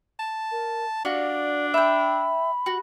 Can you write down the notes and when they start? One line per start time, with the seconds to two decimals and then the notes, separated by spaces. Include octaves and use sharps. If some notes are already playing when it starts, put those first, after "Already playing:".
0.20 A5
0.51 A#4
1.05 D4 F#4 D5 F5
1.74 E5 G5 B5
2.66 F#4